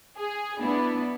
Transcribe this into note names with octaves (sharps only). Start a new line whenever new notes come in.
G#4
B3 D4 E4